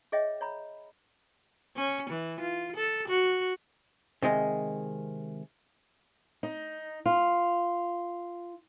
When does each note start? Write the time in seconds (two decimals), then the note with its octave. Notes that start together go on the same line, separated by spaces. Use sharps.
0.12 G#4 C#5 D#5 E5 G5
0.41 C#5 A#5 B5
1.77 C#4
2.10 E3
2.40 F4
2.76 A4
3.08 F#4
4.22 C3 D#3 G#3
6.43 D#4
7.05 F4